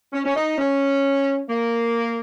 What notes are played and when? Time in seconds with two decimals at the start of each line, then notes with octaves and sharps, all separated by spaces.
0.12 C#4
0.25 C#4
0.35 D#4
0.58 C#4
1.49 A#3